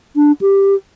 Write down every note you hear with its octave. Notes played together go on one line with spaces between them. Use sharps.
D4
G4